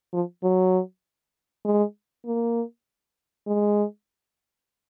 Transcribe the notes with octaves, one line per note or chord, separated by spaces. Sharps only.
F3
F#3
G#3
A#3
G#3